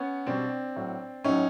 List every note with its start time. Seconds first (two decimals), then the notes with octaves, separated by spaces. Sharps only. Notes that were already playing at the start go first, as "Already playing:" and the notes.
Already playing: B3 C#4
0.26 B2 G3 C4 D4
0.76 A2 F#3
1.24 A2 F#3 C#4 D#4